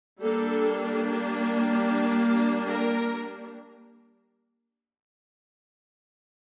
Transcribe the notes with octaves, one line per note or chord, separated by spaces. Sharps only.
G3 A#3 D4 A4
A#4